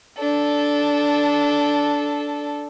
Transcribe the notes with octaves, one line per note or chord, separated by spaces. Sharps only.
D4 A4